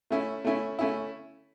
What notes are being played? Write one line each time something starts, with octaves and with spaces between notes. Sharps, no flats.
A3 C#4 E4
A3 C#4 E4
A3 C#4 E4